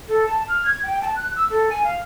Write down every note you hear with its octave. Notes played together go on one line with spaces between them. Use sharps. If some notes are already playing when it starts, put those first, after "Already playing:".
A4
A5
F6
G#6
G5
A5
F#6
E6
A4
G#5
F5